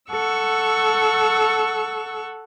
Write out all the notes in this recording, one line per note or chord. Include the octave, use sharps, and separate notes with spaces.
A4 F#5 C#6 E6